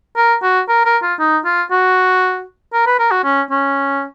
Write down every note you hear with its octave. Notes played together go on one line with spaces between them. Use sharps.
A#4
F#4
A#4
A#4
F4
D#4
F4
F#4
A#4
B4
A#4
F#4
C#4
C#4